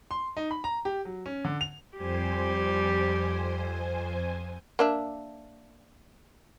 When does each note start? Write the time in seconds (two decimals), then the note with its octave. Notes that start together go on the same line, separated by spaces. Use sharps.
0.11 C6
0.37 D#4
0.51 B5
0.64 A#5
0.85 G4
1.05 F#3
1.26 C#4
1.44 D3
1.61 F7
1.96 F2 G3 G4 C5 G#5
4.79 A#3 D4 E5